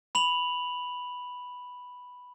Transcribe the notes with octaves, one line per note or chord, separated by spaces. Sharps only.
B5 F7 F#7